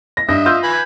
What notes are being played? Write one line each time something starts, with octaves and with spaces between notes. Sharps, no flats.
A#6
G2 D#5 E5 A#6
F4 E6 G6
B4 G#5 B5